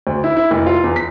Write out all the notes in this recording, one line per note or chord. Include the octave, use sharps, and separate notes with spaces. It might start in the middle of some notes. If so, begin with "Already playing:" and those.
D2
E4
E4
F1
F4
E2
B6